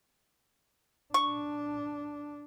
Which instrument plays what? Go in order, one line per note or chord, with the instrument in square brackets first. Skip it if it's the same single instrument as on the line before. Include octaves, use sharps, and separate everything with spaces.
[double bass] D4 [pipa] C#6